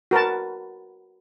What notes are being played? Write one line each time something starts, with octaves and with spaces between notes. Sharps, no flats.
F#4 A#4 B4 A5